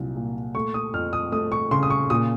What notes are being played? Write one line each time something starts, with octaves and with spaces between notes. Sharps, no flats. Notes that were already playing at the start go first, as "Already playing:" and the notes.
Already playing: C2 A#2 F#3
A#2
A3 C#6
D#6
F2 F6
D#6
A3 D#6
C#6
C#3 C6
D#6
C#6
A#2 D#6